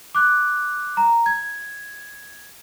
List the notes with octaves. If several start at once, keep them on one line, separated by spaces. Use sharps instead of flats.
D6 F#6
A#5
G#6